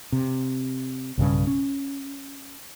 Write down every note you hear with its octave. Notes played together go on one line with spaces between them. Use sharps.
C3
B1 G2 C#3
C#4